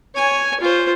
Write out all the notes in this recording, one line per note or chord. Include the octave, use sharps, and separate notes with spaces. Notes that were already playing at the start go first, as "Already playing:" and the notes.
C#5 G#5
F4 C5